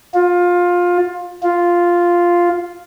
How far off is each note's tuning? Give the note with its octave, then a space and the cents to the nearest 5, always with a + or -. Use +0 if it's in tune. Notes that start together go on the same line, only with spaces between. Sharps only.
F4 +20
F4 +0